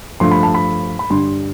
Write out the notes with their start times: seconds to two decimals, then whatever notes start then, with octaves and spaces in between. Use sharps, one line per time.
0.20 G2 F3 A3 C6
0.31 B5
0.43 A5
0.54 B5
0.99 B5
1.10 G2 D3 G3 C6